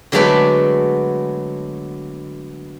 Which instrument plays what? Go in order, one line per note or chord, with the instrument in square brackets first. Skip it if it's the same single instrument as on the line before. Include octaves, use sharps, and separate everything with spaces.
[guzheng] D3 F#3 G#3 A3 B3 D4